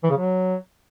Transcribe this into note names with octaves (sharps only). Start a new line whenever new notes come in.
E3
C#3
F#3